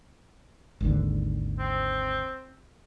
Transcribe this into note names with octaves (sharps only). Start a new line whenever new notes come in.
G#1 D#2 D3
C4